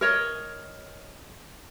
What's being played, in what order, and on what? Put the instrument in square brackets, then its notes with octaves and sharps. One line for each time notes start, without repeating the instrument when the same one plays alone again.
[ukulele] A#4 C#5 D#5